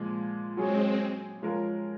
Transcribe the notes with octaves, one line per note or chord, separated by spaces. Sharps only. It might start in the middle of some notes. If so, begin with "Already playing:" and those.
Already playing: A#2 F3 G#3
F#3 G#3 C4 C#4 G#4 C#5
F3 G#3 C#4 F4 A#4